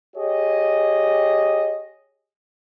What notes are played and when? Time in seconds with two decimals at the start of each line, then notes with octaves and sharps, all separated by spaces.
0.15 G4 G#4 C#5 D#5